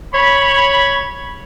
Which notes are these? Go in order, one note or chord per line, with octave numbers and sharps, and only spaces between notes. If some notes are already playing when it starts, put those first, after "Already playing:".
C#5 B5